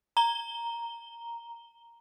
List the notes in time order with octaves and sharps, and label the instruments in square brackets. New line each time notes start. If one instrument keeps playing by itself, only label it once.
[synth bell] A#5 G7